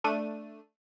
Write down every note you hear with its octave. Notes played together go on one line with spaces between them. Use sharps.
A3 D4 D#7